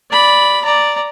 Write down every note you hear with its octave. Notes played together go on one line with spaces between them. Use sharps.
D5 B5
D5 A#5